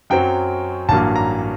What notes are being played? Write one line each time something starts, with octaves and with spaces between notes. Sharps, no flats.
F#2 F#3 C4 G5
A1 G2 F#3 A#3 A5
A#5